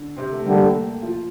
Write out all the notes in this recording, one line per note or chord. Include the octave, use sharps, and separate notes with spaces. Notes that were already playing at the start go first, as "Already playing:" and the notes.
Already playing: D3 D4
C3 C4
A3
D3 G3 A#3 D4 A4
A3
A#3
F3 F4